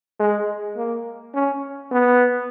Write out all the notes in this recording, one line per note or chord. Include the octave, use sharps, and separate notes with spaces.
G#3
A#3
C#4
B3